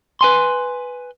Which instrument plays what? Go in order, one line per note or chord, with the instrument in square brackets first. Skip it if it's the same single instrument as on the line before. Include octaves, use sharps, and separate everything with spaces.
[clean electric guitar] B4 G#5 C6